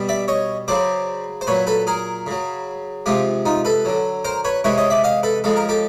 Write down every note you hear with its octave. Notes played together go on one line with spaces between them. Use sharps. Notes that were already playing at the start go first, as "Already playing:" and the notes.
Already playing: B2 G3
D5 E5
C#5 D#5
C#3 F#3 C5 D5
C5
A#2 F#3 B4 C#5
A4 B4
G#4 A#4
C#3 F#3
C3 F3 G#3 F4 G4
D#4 F4
A4 B4
D3 F#3
A#4 C5
B4 C#5
C3 E3 G#3 B4 C#5
C#5 D#5
D5 E5
D#5 F5
A4 B4
C#3 F3 G#3 A4
A#4
G4 A4